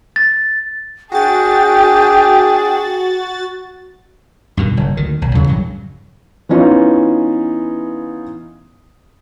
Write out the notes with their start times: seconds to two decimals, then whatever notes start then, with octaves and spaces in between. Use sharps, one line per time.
0.16 A6
1.12 D4 F#4 G#4 G5 A6
4.57 G2 B2 D#3
4.77 F#1
4.97 D2 D#3
5.22 B1
5.35 E2 C#3 E3 F#3
5.47 A#1 G2 F#3
6.49 E3 B3 C#4 D#4 F4